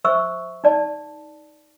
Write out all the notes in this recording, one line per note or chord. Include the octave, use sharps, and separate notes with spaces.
C5 E5 C#6 E6
D#4 D5 A5